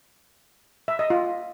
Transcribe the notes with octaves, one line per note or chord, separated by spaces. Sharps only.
E5
D#5
F4